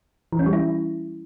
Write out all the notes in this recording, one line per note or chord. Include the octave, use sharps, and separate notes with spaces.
E3
C#4
G3
E4